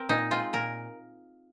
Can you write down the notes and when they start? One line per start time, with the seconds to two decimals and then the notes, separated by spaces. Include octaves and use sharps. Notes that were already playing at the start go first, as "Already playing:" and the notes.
Already playing: C4 A#4
0.09 A#2 D#4
0.31 G#3 C4 F4
0.53 A#2 A#4